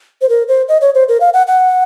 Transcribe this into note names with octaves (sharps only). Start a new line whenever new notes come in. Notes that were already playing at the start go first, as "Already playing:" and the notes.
C5
A#4
C5
D#5
C#5
C5
A#4
F5
F#5
F#5